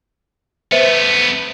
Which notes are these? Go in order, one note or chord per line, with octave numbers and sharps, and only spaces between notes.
A3 B3 B4 C5 E5